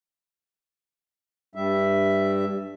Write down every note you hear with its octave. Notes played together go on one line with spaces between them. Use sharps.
G2 G3 E5